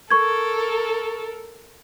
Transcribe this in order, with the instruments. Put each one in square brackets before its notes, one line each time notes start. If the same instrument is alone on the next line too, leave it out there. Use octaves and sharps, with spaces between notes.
[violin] A4 A#4 [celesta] C#6 G#6